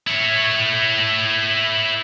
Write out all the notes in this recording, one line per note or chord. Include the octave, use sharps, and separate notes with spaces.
E4 C#5